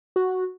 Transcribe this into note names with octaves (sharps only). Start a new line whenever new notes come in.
F#4